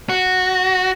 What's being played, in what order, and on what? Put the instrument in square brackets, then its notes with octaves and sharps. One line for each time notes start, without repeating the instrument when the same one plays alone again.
[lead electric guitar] F#4